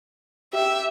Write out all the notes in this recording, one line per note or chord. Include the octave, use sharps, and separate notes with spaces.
G4 E5